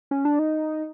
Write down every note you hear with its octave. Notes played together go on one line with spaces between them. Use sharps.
C#4
D4
D#4